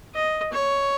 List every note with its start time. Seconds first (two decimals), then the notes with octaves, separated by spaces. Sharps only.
0.14 D#5
0.53 C#5